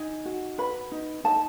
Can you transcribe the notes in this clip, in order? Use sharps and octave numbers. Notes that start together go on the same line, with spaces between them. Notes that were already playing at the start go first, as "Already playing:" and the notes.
Already playing: D#4 G#5
F#4
B4 B5
D#4
D#4 A5